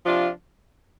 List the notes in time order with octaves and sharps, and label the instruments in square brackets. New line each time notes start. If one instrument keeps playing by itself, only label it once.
[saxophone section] C3 F3 D4 F4